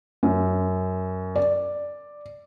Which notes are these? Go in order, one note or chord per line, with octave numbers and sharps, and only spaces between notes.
F#2
D5